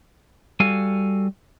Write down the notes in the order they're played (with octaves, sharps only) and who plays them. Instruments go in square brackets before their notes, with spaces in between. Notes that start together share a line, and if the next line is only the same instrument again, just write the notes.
[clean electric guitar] G3 F#4 A4 F5 G#5